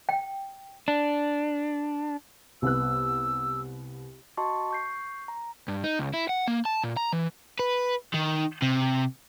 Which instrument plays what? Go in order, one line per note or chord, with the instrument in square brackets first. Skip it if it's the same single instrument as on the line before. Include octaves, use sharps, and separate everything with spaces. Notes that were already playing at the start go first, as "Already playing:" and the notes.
[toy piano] G5
[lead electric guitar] D4
[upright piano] C2 B3 F#6 [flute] E6
[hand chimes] F#4 D#5 A5 C6 C#6
C#6 G6 C7
A#5
[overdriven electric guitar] G2
D#4
C#2
E4
F#5
A#3
A5
A#2
A#5
E3
B4
D#3
C3